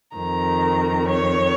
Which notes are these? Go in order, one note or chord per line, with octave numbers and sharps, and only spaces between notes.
F2 D#3 A#5
C#5